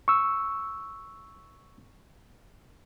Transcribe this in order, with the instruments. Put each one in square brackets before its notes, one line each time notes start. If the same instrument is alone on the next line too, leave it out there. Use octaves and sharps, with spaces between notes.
[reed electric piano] C#6 E6